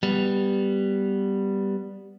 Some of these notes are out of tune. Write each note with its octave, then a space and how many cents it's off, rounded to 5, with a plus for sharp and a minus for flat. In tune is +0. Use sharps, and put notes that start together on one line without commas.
G3 +0 B3 +0